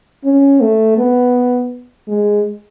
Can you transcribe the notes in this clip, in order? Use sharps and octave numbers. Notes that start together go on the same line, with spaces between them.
C#4
A3
B3
G#3